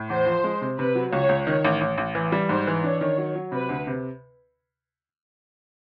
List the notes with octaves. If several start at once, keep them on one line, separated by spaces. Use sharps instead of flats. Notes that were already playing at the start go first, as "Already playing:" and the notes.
Already playing: A2
E2 C5
F3
G#3
C3
C3 B4
F#3
C#2 C#5
C#2
D#3 C#5
A1
A1
A1
E3
G3
G#2 C5
E3
D4 C#5
D#3
F#3
F#3
C3 B4
D2
C3